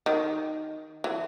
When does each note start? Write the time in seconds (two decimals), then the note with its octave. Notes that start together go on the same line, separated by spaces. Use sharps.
0.06 D#3
1.04 E3